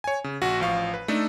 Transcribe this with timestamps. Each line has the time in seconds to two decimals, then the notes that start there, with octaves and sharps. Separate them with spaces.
0.04 C#5 G#5
0.24 C#3
0.41 A#1 F#4
0.60 A1 F3 F5 C#6
0.94 B4
1.08 A3 D4 D#4 A4